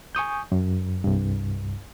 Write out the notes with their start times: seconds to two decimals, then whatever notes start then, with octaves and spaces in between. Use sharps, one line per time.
0.15 G#5 C#6 D#6 G6
0.52 F#2
1.04 C2 G2